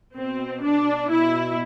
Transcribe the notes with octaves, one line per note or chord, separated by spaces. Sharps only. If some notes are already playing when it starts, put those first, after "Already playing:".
B2 C4
D4
B2 E4